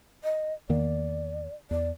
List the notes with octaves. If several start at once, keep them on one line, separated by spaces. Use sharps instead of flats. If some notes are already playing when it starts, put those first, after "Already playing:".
D#5
E2 D#3 A#3 D5
E2 D5